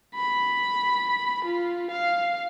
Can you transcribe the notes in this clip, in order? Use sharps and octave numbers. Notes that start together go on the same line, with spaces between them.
B5
F4
F5